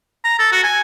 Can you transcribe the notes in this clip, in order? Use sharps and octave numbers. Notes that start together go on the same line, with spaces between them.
A#5
A4
F#4
G#5